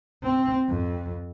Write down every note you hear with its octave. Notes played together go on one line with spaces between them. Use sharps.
C4
F2